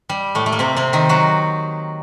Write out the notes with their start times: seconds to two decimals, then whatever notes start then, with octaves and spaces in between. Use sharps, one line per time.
0.09 G3
0.35 A2 A3
0.46 A3
0.52 A#3
0.59 C3 C4
0.77 C3 C4
0.93 D#3 D#4
1.09 F#3 F#4